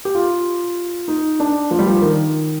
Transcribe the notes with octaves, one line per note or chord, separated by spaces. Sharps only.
G4
F4
D#4
D4
F3
G3
F3
D#3